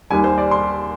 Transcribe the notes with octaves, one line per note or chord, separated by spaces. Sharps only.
D#2 D#3 G3 G#5
C5
D5
C6